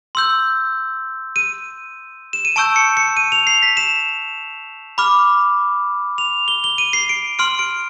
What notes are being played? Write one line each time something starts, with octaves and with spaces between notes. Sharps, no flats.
C6 E6 G6
D#7
E7
D#7
A5 C#6 E6 G6 D7
C#7
C#7
D#7
F7
C7
B6
E7
B5 D6 F6
F7
G7
G7
D#7
C7
D7
C6 F6 D7
D7